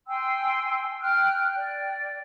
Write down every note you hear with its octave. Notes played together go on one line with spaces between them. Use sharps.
G5 G#5 C6 E6
G5 F6 F#6
D5 G5